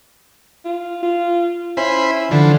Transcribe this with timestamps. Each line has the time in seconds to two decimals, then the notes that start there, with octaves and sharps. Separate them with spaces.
0.65 F4
1.03 F4
1.77 C#4 E4 C5 B5
2.31 D3 E3 F3 D4